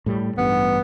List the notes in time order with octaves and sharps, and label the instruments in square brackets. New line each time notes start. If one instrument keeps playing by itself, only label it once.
[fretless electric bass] A2 G3
[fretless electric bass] A1 G2 [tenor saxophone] B3